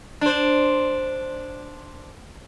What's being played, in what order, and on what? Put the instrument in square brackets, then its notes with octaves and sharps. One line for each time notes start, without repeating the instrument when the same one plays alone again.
[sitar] D4 C5